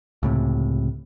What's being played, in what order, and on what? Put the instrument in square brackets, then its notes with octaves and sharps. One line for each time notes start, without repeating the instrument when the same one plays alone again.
[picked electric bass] C#2 A2 C3